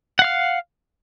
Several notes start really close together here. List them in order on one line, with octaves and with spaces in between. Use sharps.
F#5 F5 F6